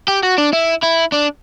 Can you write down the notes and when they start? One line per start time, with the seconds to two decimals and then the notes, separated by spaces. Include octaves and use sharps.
0.08 G4
0.23 F#4
0.38 D4
0.53 E4
0.83 E4
1.12 D4